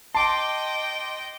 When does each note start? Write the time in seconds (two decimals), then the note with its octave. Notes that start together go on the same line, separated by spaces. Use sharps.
0.15 D#5 G5 A5 C6 D6